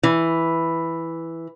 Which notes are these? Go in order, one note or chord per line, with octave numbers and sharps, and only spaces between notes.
E3